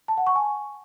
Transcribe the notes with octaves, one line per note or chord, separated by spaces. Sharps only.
A5
F#5
C#6
G#5